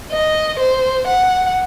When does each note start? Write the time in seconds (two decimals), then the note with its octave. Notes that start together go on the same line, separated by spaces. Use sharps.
0.12 D#5
0.60 C5
1.07 F#5